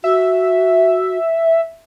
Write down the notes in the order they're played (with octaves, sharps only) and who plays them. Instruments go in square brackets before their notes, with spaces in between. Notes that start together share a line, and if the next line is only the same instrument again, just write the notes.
[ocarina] F#4 [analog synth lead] E5